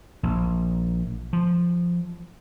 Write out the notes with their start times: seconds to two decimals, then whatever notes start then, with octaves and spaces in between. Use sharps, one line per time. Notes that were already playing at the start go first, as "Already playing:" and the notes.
0.23 A#1
1.33 F3